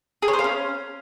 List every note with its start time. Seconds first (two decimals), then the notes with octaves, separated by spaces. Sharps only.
0.22 G#4
0.28 C#5
0.33 C5
0.39 F5
0.44 C#4